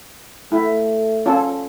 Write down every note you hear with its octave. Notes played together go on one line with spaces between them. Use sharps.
A3 E4
C#4 F4 A4